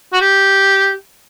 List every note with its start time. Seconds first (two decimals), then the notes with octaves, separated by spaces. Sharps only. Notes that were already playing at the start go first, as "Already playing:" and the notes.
0.13 F#4
0.21 G4